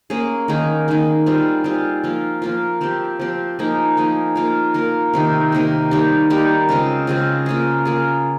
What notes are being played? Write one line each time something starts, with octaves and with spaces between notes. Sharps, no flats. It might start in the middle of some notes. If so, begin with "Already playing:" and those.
A#3 C#4 G#4
D#3 A#3 D#4 G#4
D#3 A#3 D#4 G#4
G3 C4 F4 G#4
G3 C4 F4 G#4
F3 A#3 F4
F3 A#3 F4
F3 C4 G4
F3 C4 G4
F3 A#3 D#4 G#4
F3 A#3 D#4 G#4
A#3 F4 A#4
A#3 F4 A#4
C3 D#3 A#3
C3 D#3 A#3
G3 A#3 D#4 G4
G3 A#3 D#4 G4
C#3 G#3 C4 F4
C#3 G#3 C4 F4
A#3 F4 G#4
A#3 F4 G#4